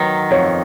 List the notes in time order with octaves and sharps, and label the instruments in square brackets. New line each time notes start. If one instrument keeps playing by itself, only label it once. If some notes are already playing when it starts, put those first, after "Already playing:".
Already playing: [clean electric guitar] D#3 F#3 [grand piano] B4
[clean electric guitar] F2 [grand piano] C#5